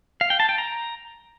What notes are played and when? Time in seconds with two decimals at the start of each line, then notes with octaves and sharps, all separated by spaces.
0.21 F5
0.30 G5
0.40 A5
0.49 G5
0.58 A#5